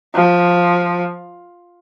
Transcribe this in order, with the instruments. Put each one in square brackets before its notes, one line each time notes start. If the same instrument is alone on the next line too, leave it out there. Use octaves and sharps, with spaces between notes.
[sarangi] F3